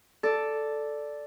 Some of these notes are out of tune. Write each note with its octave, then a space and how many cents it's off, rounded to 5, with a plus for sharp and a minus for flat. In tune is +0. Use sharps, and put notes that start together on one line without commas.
A4 +0 D5 +0